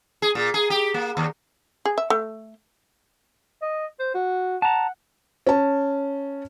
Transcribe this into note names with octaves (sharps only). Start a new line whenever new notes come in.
G#4
A#2
G#4
G4
A#3
D#2
G#4
E5
A3
D#5
C5
F#4
F#5 A5 A#5
C#4 A5